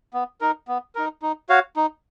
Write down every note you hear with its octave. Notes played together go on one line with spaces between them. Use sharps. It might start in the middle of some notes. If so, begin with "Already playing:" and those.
B3
D#4 A#4
B3
D#4 A#4
D#4
F#4 C#5 F5
D#4